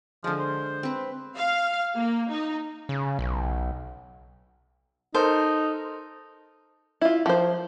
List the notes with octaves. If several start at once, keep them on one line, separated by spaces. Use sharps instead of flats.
D3 F3 G#3
C5
C4 B4
F5
A#3
D#4
C#3
B1
D#4 A4 A#4 C5
E4 F4
F3 C5